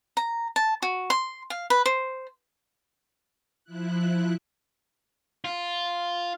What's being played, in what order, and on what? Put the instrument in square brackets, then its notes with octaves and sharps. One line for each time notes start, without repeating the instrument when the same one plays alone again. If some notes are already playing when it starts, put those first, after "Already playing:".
[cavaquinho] A#5
A5
F#4
C6
F5
B4
C5
[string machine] F3 E4 F#6
[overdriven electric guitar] F4